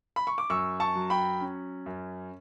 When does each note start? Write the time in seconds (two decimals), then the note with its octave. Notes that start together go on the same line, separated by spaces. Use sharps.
0.16 B5
0.27 C#6
0.38 D6
0.50 F#2 C#6 E6
0.80 A5 C#6
0.95 F#3
1.10 G5 B5
1.41 C#4
1.86 F#2